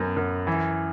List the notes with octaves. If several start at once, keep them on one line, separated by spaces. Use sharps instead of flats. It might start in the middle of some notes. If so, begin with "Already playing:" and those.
Already playing: F#2 B3
F#2
E3